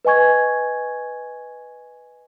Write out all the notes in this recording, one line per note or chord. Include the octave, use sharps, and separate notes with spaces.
B4 D#5 G#5 C#6 G#6